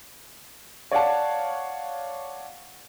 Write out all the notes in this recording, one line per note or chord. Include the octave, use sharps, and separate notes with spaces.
C#5 D5 F5 F#5 A5